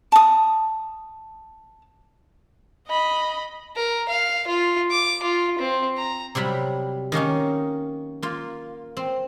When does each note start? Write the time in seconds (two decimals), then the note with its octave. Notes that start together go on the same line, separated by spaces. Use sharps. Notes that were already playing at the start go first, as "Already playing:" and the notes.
0.12 A5 D#6
2.87 D#5 B5
3.76 A#4
4.09 F5
4.47 F4
4.91 D6
5.23 F4
5.59 C4
5.97 A#5
6.35 C3 F#3 G3 B5
7.12 D#3 A#3 C#4 D#4
8.22 A#3 F4
8.97 C4